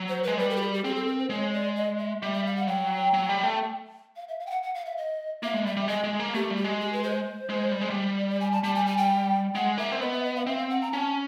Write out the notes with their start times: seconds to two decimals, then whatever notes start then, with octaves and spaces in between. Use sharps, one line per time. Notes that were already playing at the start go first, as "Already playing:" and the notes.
Already playing: F#3
0.09 C5
0.23 G#3 B4
0.38 G3 B4
0.50 A#4
0.56 G4
0.61 G#4
0.73 G4
0.84 C4 G#4
0.96 A4
1.07 A#4
1.19 C5
1.30 G#3 C#5
1.53 D5
1.76 D#5
1.99 E5
2.22 G3 E5
2.33 E5
2.46 F5
2.56 F#5
2.67 F#3 G5
3.14 F#3
3.29 G3
3.44 A3
4.16 F5
4.28 E5
4.40 F5
4.46 G5
4.50 F#5
4.63 F#5
4.74 F5
4.85 E5
4.97 D#5
5.43 A#3 E5
5.54 G#3
5.65 G3 E5
5.77 G3
5.88 G#3 D#5
6.04 G#3
6.20 A#3
6.34 A3 G4
6.50 G3
6.57 G4
6.64 G#3
6.80 G4
6.93 B4
7.03 C5
7.49 G#3
7.71 G3
7.81 G#3
7.90 G3
8.18 D5
8.29 D5
8.40 G#5
8.52 A5
8.63 G3 A5
8.75 G#5
8.86 G#5
8.97 G5
9.55 G#3 F#5
9.78 A#3 E5
9.92 C4
10.00 B3 D#5
10.12 E5
10.24 D#5
10.36 F5
10.46 C4 E5
10.59 F5
10.70 F#5
10.81 A#5
10.92 C#4 A5